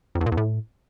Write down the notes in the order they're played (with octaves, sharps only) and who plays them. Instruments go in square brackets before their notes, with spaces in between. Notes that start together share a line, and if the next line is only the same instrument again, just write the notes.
[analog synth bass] F2
E2
A#2
E2
A2